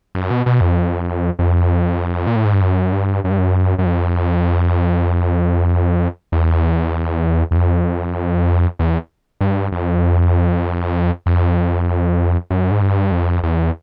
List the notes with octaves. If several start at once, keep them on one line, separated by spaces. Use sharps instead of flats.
F#2
B2
B2
F2
F2
A#2
A2
G#2
G2
F#2
G2
F#2
G2
F#2
F#2
F2
E2
E2
F2
E2
G2
F2
F2
F#2
G#2
G2
F2
E2